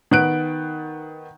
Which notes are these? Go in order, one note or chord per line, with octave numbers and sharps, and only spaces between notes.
D#3 B3 F#6 D7